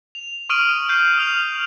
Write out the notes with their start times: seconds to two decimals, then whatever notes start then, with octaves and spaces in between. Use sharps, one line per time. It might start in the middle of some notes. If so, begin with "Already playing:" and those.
0.15 F7
0.49 C#6 D#6 F6 D7 D#7 F#7
0.89 D#6 G6 C7
1.17 D#6 F6 F7 F#7